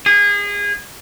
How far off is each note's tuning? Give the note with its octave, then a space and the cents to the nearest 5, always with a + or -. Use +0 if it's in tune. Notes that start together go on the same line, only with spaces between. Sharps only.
G#4 -30